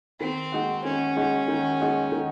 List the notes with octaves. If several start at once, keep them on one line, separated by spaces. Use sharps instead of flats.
D#3 C4
G#3 D#4 F#4
D#3 C#4
G#3 D#4 F#4
D#3
G#3 D#4 F#4
D#3